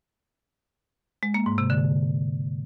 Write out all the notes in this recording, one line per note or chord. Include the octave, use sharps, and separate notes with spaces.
G#3
A#3
G#2
C3
D3